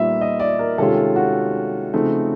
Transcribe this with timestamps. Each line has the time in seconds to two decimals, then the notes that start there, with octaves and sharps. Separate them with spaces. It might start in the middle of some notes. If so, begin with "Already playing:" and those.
Already playing: A#2 G3 B3 D#4 E5
0.21 D#5
0.40 D5
0.59 A#4
0.78 C3 D#3 G#3 C#4 F4 A4
1.16 F#4
1.93 C#3 F3 A3 C4 D#4